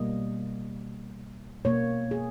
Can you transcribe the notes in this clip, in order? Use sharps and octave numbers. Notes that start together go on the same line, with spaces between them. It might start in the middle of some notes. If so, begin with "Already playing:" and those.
Already playing: B2 G3 A#3 D#5
B2 A#3 C#5
G#4